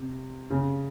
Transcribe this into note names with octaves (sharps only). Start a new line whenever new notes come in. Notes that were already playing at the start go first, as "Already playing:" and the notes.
Already playing: C3
C#3